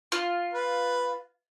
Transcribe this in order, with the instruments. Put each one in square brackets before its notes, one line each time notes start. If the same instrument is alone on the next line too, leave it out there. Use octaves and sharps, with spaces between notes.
[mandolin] F4
[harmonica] B4